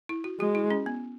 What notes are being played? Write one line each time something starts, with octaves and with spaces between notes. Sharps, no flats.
E4
F#4
G#3 F#4
E4
C#4
B3